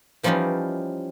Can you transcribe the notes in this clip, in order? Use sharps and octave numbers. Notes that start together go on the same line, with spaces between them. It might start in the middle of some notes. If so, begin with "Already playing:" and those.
E3 F3 G3 C#4 D#4 F4